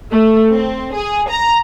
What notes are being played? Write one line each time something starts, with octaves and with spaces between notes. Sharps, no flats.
A3
C4
G#4
A#5